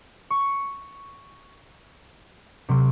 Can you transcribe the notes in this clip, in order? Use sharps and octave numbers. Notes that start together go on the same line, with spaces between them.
C#6
C3 F#3 C6 D7